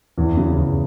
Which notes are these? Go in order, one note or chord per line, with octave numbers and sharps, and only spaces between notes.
E2
C#3
E2